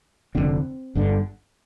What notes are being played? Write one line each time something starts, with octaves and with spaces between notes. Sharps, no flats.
F1 D#2 D3 C4
G1 G2 D3